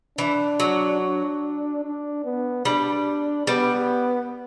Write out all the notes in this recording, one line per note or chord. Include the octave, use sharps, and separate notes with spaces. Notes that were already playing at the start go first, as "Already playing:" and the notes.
E3 D4
F#3
D4
D4
B3
G3 D4
G3 B3